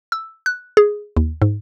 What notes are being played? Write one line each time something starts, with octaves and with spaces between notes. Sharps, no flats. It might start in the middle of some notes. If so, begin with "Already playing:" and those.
E6
F#6
G#4
D#2
G#2